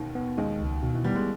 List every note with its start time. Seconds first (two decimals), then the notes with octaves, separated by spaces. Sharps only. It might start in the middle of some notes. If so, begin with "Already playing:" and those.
Already playing: D#2 B2 D#3
0.15 B3
0.37 D#2 D#3 G#3
0.60 C#2
0.83 B2 D#3
0.94 E3
1.04 G3 B3
1.15 G#3